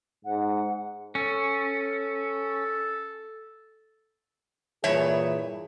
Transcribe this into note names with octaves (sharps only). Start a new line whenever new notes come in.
G#2 F#5
C#4 A4
G2 A#2 E3 G#4 C#5 E5